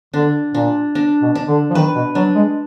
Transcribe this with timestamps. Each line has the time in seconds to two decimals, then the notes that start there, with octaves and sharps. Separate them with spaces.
0.14 D3 D4
0.54 A#2 D4
0.95 D4
1.22 B2
1.35 D4
1.48 D3
1.70 F3
1.75 D#3 B4
1.96 B2
2.15 F#3 D4
2.35 G#3